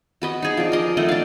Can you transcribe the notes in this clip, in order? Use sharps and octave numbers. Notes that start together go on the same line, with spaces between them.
F#4 B4 D#5
D#4 G#4
F3 D4
A#4 D#5
A3 D#4 D#5 F#5
D4 F5